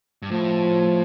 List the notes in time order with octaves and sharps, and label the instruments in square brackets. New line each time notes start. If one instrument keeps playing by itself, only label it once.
[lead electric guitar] G2
[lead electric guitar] A2 [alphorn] F3